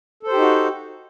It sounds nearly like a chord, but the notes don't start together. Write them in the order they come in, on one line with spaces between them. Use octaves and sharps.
A4 C5 G4 D#4 F#4